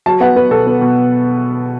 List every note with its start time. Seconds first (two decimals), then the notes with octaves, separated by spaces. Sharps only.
0.06 F#3 A5
0.20 B3 F#5
0.36 B3 B4
0.51 B2 A4
0.67 B3
0.82 B2